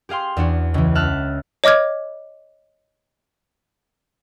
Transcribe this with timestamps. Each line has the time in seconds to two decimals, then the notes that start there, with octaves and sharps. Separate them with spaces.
0.09 G4 G#4 F5 G5 C6
0.37 E2 D4 F#4
0.74 C#2 E3
0.95 E5 A5 F6 F#6
1.64 C#5 D#5 D6 F6 G#6